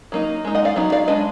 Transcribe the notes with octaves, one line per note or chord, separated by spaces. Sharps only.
F#3 A#3 D#4
G#3 D#4
D#5 F#5
D5 F5
F#3 B3 D#4
D5 F5
G#3 D4 B4 D#5